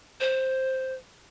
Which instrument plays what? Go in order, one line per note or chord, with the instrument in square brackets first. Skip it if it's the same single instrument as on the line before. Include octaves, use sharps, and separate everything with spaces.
[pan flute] C5